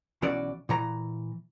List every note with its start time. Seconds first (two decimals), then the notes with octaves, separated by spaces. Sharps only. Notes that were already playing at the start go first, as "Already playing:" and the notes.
0.22 B1 E3 C#4 F#4 D5
0.69 A#2 E3 A#5